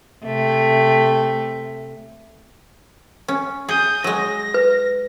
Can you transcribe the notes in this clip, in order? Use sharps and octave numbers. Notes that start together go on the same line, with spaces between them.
C3 A3
C#4
G#4 D#6 G6
F#3 G#3 A#6
B4